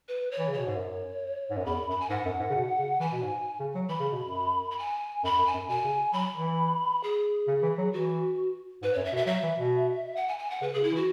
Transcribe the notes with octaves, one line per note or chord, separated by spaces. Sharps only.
B4
C#5
E3
C#3
B2 C#5
G#2
F#2
G#2
F#2
E2 B5
F#2 B5
G#5
G#2 F#5
F#2
G#2
C#3
B2
C#3
E3 G#5
B2
G#2
C#3
F#3
E3 B5
C#3
B2
F#2
B5
G#5
F#2 B5
F#2
G#5
F#2
B2 G#5
C#3
F#3 B5
E3
G#4
C#3
E3
F#3
E3 F#4
G#2 B4
F#2 C#5
E5
B2
E5
F#3 E5
E3
B2
F#5
G#5
G#5
F#5
C#3 B4
C#3 G#4
E4
E3
F#4